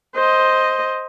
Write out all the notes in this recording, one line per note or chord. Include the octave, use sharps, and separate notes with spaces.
C5 D#5